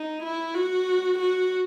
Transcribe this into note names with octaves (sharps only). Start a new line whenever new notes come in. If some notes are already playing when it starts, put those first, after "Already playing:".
Already playing: D#4
E4
F#4
F#4